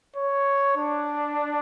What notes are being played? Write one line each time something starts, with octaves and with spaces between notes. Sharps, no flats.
C#5
D4